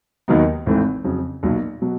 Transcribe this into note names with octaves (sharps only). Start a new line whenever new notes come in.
D#2 D#3 F#3 B3 D#4
G#1 G#2 E3 A3 C4
F2 C#3 F#3
B1 A#2 F#3
B2 F#3